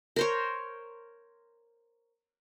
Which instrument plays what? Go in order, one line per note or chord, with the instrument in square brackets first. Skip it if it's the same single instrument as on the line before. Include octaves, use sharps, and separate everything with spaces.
[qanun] A#4 C5 C#5